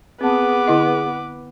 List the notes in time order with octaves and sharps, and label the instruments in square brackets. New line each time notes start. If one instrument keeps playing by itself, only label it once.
[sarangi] B3 [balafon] C4 A5 [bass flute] G#4 [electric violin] B4 D6
[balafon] D3 E4 D#5